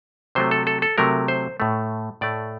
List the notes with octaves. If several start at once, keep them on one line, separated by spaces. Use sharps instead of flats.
C3 F#3 A3 C5
A4
A4
A4
C3 F#3 A3 A#4
C5
A2 A3
A2 A3 D5